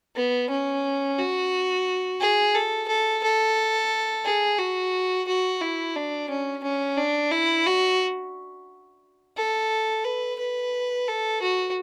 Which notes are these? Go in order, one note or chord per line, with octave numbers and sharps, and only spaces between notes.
B3
C#4
F#4
G#4
A4
A4
A4
G#4
F#4
F#4
E4
D4
C#4
C#4
D4
E4
F#4
A4
B4
B4
A4
F#4